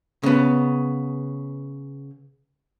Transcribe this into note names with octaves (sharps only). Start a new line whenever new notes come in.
C#3 B3